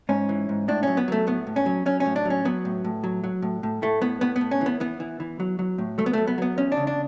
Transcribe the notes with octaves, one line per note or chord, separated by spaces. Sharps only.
G#2 C#4
E3
G#2
A2 D4
F#3 C#4
B3
F#3 A3
A2 B3
A2
C#4
F#3
F#3 C#4
C#4
A2
D4
F#3
C#4
F#3 B3
A2
A2
F#3
F#3
A2
A2
A2 A3
A2 B3
A2 B3
B3
A2
C#4
E3 B3
E3 B3
E3
E3
F#3
F#3
A2
F#3 A3
B3
F#3 A3
B3
F#3 B3
E2 C#4
D4
C#3
D4